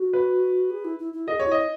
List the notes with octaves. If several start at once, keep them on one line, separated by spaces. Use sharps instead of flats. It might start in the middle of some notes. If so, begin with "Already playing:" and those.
Already playing: F#4
B4
G#4
E4
E4
E4
G#4 A#4 D#5
C#5
E4 D#5